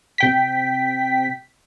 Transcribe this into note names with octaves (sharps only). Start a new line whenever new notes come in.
C3 G5 B6